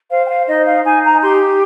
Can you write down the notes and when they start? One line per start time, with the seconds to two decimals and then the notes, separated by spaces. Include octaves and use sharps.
0.09 C5 F5
0.24 G5
0.28 F5
0.47 D#4 D#5
0.65 F5
0.83 D#4 G#5
1.03 A#5
1.22 G4 C6